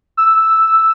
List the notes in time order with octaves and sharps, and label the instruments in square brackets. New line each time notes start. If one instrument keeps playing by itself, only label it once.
[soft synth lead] E6